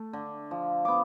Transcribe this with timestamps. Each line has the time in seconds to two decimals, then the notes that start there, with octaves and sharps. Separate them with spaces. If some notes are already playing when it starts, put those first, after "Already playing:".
Already playing: A3
0.13 D3
0.51 F3
0.85 B3 D6